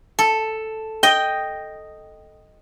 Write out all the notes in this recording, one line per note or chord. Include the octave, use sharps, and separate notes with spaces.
A4
D#5 G5